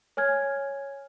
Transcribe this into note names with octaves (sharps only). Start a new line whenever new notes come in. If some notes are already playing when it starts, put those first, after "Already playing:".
C#5 G#5 F6 G#6